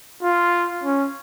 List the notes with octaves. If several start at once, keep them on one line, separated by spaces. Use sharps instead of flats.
F4
C#4